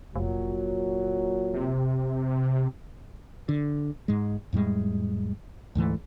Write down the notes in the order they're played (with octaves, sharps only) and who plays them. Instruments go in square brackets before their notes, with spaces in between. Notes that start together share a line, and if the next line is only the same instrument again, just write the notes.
[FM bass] F1 [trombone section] A#2 F#3
[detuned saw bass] C3
[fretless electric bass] D3
G#2 G#3
F2 A2 G3 G#3
D2 G#2 E3 A3